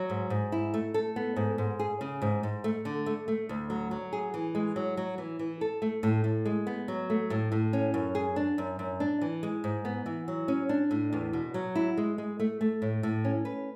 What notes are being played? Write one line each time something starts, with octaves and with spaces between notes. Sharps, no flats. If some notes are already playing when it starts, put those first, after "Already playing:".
Already playing: F#3
G#2
G#2
E4
A3
A4
B3
G#2
G#2
G#4
C#3
G#2
G#2
A3
D3
A3
A3
D2
F#3
F#3
G#4
E3
G#3
F#3
F#3
E3
E3
A4
A3
A2
A2
G#3
B3
F#3
A3
A2
A2
C#4
F#2
G#4
D4
F#2
F#2
D4
E3
G#3
G#2
B3
E3
F#3
C#4
D4
A2
E2
B2
F#3
E4
G#3
G#3
A3
A3
A2
A2
C#4
B4